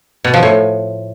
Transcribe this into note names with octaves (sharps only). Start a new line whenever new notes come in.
B2
F3
A2